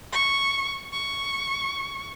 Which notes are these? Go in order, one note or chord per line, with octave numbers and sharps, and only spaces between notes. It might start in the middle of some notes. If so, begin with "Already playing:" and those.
C#6
C#6